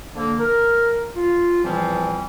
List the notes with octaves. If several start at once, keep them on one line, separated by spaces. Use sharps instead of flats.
D3 F3 A#3
A#4
F4
E2 A#2 E3 F3 G3 C4